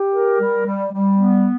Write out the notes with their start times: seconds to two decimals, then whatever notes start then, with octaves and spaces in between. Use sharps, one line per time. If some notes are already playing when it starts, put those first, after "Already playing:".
Already playing: G4
0.14 A#4
0.40 G3
0.67 G3
0.93 G3
1.18 B3